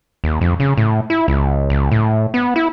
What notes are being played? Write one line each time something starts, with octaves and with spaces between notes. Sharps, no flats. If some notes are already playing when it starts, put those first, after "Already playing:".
D#2
F2
C#3
A2
E4
C#2
C#2
A2
B3
E4